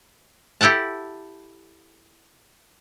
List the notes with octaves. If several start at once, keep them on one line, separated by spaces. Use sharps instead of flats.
E4 G4 A4 F#5 A5